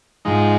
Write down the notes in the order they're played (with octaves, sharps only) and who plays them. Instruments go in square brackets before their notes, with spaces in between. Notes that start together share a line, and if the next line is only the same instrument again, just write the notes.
[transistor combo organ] G#2 F3 G#3 D#4